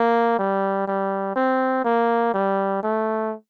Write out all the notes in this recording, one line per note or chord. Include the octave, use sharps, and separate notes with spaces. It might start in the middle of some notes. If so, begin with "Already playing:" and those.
Already playing: A#3
G3
G3
C4
A#3
G3
A3